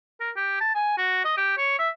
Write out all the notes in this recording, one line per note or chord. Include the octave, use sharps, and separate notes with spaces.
A#4
G4
A5
G#5
F#4
D#5
G4
C#5
E5